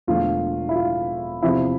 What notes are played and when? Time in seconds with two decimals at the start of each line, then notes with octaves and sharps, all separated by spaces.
0.07 E1 E2 D3 F3 A3 F4
0.69 E4
0.76 F4
1.42 E2 C3 F3 E4